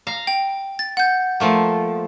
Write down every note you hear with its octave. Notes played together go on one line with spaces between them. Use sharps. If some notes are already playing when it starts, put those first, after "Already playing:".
F5 A#5
G5
A6
F#5 G6
F3 A3 A#3